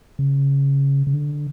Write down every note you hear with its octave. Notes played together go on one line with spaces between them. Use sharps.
C#3
C#3
D3